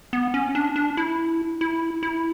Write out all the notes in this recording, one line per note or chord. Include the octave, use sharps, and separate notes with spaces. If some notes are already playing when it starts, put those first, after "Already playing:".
B3
C#4
D4
D4
E4
E4
E4